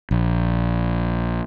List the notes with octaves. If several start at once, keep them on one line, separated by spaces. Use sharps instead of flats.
A#1